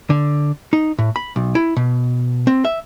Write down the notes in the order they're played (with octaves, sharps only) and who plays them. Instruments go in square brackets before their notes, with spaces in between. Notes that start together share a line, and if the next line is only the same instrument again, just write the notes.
[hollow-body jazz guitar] D3
D#4
A2
B5
B1
E4
B2
C4
E5